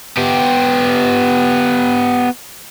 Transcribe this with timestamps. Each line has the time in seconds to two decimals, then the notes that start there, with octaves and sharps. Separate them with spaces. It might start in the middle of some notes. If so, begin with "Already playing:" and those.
0.18 B3 G4